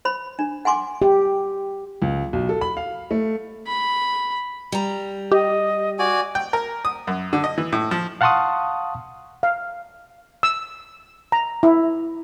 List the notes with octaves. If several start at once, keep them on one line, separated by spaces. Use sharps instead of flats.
C5 B5
D4
F#5 G#5 C6 D6
G4
C#2
B1
A4
B5
F5
A3
B5
G3 A#5
G4 D#5
F#4 D5 G#5
G5
A#4
D#6
F#2
D3
D#5
E3
A2
F3
F5 F#5 A5 C6 C#6 D#6
F5
E6
A#5
E4